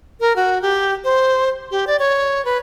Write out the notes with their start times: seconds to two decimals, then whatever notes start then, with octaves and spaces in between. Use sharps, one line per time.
0.20 A#4
0.36 F#4
0.62 G4
1.04 C5
1.71 G4
1.87 D5
1.99 C#5
2.45 B4